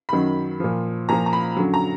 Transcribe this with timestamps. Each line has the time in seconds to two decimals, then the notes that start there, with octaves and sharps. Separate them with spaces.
0.09 F#2 D#3 F#3 B5
0.60 A#2 F3
1.09 A#2 F3 A#5
1.26 A#5
1.33 B5
1.56 F#2 D3 F#3
1.74 A#5